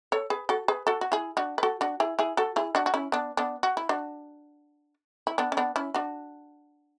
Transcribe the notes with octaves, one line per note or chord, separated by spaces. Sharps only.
A4 C#5
G#4 B4
F#4 A4
G#4 B4
F#4 A4
F#4
E4 G#4
D4 F#4
B4
F#4 A4
D4 F#4
E4 G#4
E4 G#4
F#4 A4
E4 G#4
D4 F#4
F#4
C#4 E4
B3 D4
B3 D4
F#4
E4
D4 F#4
E4
B3 D4
C#4
B3 D4
C#4 E4
D4 F#4